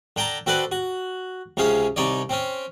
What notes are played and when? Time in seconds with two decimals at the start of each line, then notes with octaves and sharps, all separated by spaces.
0.16 D3 G5 A5 A#5
0.46 C4 F#4 A4 B4 D5
0.72 F#4
1.57 C#2 C3 C#4 G#4 F5
1.96 C2 D#4 C#5 D5
2.29 C4 C#4